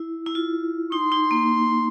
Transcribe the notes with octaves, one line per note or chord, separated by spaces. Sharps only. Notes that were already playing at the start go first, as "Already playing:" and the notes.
Already playing: E4
E4
F4
D#4 C6
D#4
A#3